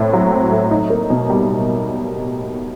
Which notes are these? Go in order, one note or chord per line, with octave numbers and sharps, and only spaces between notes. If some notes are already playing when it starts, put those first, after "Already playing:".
Already playing: A2 A3 C4
F#3
C4
A3
D#4
A#3
B2
G3